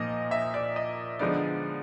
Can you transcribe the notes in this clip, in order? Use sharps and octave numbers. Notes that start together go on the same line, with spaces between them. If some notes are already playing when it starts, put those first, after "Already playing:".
Already playing: A#2 F3 A#3 D#4 D#5
E5
D5
D#5
D3 F3 G#3 B3 D#4 D5